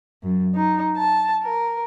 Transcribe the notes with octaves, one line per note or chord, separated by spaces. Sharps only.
F#2
D#4
A5
A#4